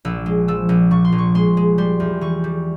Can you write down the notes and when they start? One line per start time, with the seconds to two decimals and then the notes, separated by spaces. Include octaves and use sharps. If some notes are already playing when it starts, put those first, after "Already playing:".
0.05 A#1 E6
0.26 G#3
0.48 F3 E6
0.69 A#1
0.91 A#2 C#6
1.05 C6
1.12 A#1
1.18 C#6
1.35 G#3 C6
1.57 G#3
1.78 G3 C6
2.00 E2
2.21 E3 C#6
2.44 G3